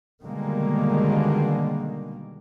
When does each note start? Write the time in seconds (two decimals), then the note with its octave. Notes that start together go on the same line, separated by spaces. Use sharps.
0.22 B2 D3 D#3 G3 G#3 A#3